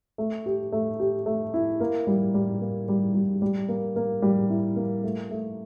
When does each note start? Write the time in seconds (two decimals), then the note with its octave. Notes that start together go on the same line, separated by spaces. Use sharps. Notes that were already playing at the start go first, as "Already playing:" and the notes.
0.18 A3
0.46 G4
0.72 A3
1.00 G4
1.26 A3
1.54 E4
1.80 A#3
2.07 G3
2.34 G3
2.61 A#3
2.88 G3
3.14 G3
3.42 G3
3.69 A#3
3.96 A#3
4.22 G3
4.50 E4
4.76 A#3
5.04 A3
5.31 A3